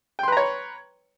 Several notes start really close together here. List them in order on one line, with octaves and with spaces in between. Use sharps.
G5 C6 B4 A#5 C#5